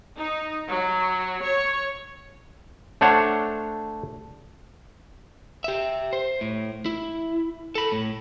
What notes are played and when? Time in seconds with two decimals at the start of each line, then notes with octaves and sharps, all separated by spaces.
0.17 D#4
0.68 F#3
1.43 C#5
3.01 A3 D4 C5 C#5 F#5
5.64 G4 E5
6.13 C5
6.41 A2
6.86 E4
7.75 A4 B5
7.92 A2